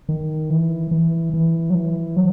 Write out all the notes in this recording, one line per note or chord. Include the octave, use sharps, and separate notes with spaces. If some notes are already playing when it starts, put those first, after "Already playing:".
D#3
E3
E3
E3
F#3
E3
F#3